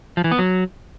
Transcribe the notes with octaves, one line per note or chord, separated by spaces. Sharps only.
F3
E3
B3
F#3